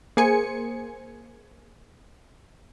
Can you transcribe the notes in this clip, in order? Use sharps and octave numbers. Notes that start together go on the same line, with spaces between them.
A#3 G#4 C5 G#5 C#7